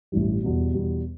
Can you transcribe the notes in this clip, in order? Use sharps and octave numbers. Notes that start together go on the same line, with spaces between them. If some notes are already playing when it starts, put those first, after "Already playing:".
A1 G2 E3 G3
E2 B2 G3
E2 B2 G3